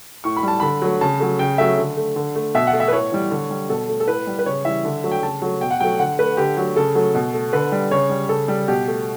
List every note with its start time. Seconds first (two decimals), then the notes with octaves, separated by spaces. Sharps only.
0.24 A2 C#6
0.36 B5
0.43 G3 A5
0.60 D3 B5
0.82 F#3 A3
1.01 C#3 A5
1.20 F#3 A3
1.39 C#3 G5
1.58 F#3 A3 E5
1.78 D3
1.97 A3
2.16 D3
2.35 A3
2.54 B2 E5
2.67 F#5
2.73 A3
2.80 E5
2.88 B4
2.92 A2 C#5
3.12 E3 G3
3.31 D3
3.51 G3
3.69 B2 A4
3.89 A3
4.00 A4
4.07 A2 B4
4.27 G3
4.39 B4
4.46 C#3 C#5
4.65 E3 G3 E5
4.85 D3
5.04 F#3 A3
5.12 G5
5.23 C#3 A5
5.42 F#3 A3
5.61 B2 G5
5.71 F#5
5.80 F#3 A3 G5
5.99 D3 F#5
6.19 A3 B4
6.37 D3 G4
6.57 F#3 A3
6.76 C#3 A4
6.95 F#3 A3
7.15 B2
7.34 A3
7.53 D3 B4
7.72 G3
7.91 C#3 C#5
8.10 G3
8.29 C#3 A4
8.48 G3
8.68 B2 G4
8.87 A3